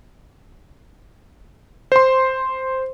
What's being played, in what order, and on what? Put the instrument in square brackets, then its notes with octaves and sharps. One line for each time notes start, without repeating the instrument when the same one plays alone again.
[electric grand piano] C5 C6